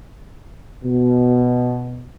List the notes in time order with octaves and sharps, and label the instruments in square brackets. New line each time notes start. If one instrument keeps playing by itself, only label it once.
[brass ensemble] B2